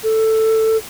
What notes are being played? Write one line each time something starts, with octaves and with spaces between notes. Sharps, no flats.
A4